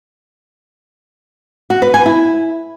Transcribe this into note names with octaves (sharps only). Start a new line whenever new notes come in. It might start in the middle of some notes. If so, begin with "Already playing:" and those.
F#4
B4
G#5
E4